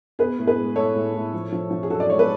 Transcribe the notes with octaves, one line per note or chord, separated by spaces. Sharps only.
B3 G#4 B4
A2
G#4 B4
G#3
A2 A4 C#5
A2
A2
F3
F3
F3
G#4
F#2 F#4 A4
D5
G#3 C#5
G#4 B4